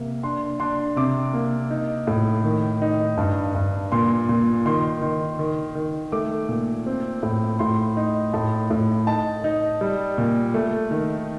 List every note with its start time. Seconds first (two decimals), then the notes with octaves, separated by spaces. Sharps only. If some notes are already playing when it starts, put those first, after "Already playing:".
Already playing: C3 A#3
0.23 D4 C6
0.60 D4 C6
0.96 C3 D6
1.33 A#3
1.71 D#4
2.07 A2
2.44 D#3
2.82 D#4
3.17 G2
3.55 G2
3.92 A#2 C6
4.29 A#2
4.66 D#3 C6
5.02 D#3
5.39 D#3
5.75 D#3
6.12 A3 D6
6.49 A#2
6.86 C4
7.23 A2
7.59 A2 C6
7.97 D#4
8.33 A2 A5
8.70 A2
9.07 D#4 A5
9.44 D#4
9.81 G3
10.18 A#2
10.54 A3
10.91 D#3